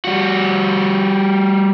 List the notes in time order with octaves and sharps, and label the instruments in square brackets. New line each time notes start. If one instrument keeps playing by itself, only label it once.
[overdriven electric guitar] G3 F#4